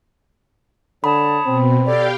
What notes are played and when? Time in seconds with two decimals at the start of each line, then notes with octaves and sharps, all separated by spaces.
1.04 D3 C#5 A5 B5 D#6
1.45 B2 C4
1.84 G4 A4 C#5 D5 F5 G5